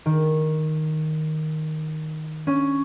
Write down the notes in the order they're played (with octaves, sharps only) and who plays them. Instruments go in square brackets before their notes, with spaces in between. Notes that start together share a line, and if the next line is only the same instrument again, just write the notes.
[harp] D#3
C#4